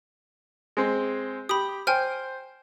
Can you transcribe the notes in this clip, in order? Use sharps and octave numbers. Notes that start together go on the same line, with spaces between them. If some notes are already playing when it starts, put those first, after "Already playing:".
G#3 C4
G4 B5 D#6
C5 G5 G#5 F6